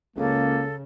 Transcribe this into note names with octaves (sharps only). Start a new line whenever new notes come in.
C#2 C#3 A#3 A4